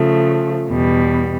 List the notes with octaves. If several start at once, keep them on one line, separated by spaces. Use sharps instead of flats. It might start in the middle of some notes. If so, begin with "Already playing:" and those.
Already playing: C#3 F3 A3
E2 B2 G3